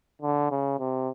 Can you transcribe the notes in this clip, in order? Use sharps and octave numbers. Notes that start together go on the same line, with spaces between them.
D3
C#3
C3